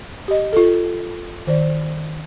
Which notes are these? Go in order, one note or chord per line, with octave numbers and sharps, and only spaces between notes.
G4 D#5
F4 A4
D#3 C5 D5